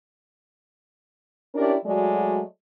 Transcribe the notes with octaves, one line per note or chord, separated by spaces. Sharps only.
C#4 D4 E4 G4 A#4 D5
F#3 G#3 A3 F#4 D5